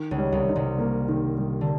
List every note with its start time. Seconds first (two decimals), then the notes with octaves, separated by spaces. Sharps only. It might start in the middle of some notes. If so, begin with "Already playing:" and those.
Already playing: D#3
0.11 C#2 C#3
0.18 G3
0.32 C2 C3
0.49 D#4
0.56 C2 C3
0.78 A#3
1.09 D#3
1.38 G3
1.61 D3